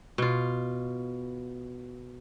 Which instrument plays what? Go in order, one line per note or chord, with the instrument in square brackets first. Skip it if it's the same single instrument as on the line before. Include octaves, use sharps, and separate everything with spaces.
[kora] B2 F4